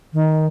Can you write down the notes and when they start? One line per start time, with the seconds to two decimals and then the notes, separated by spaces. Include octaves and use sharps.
0.13 D#3